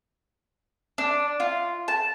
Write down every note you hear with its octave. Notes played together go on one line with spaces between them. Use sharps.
D4
F4
A5